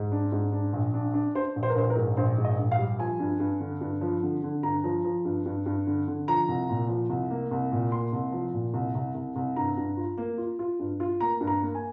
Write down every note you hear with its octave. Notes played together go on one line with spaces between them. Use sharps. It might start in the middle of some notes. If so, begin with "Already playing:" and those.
Already playing: G#2
D4
G#2
D4
A#1
D4
D4
D4 C5
A#1
C5
A#4
A#1 C5
A#4
G#2
A#1 C5
G#2
D#5
A#1
F5
G3
F3 G#5
G2
G2
D3
G2
F3
D3
D3
G2 A#5
F3
F3
G2
G2
G2
D3
D3
F3 A#5
C2
A#2
F3
C2
A#3
C2
A#2
A#3 C6
C2
F3
A#2
C2
C2
C2
C2
G2 A#5
G2
F4
A#3
F4
F4
G2
F4
A#3 A#5
G2
A#5
A#3
G#5